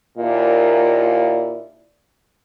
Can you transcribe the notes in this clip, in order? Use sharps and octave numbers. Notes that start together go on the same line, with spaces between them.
D#2 A#2 E4 A#4 D5